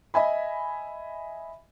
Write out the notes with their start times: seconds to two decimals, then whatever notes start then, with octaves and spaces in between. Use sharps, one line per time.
0.14 D#5 E5 G#5 B5